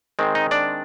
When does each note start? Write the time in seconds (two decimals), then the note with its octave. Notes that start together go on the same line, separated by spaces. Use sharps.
0.19 D#3 G#3 C4
0.35 D#4 D#5
0.51 D4 D5